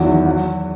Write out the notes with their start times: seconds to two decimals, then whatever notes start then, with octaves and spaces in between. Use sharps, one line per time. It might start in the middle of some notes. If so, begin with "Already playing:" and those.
Already playing: E2 D#3 F#3 E4
0.26 F#3